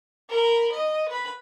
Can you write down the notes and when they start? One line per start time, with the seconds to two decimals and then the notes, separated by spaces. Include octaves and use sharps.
0.30 A#4 B5
0.72 D#5
1.08 B4 B5